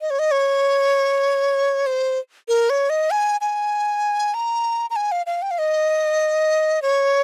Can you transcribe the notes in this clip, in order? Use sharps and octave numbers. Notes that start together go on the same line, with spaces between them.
D#5
C#5
D#5
C#5
C5
A#4
C#5
D#5
G#5
G#5
A#5
A#5
G#5
F5
F5
G5
F5
D#5
C#5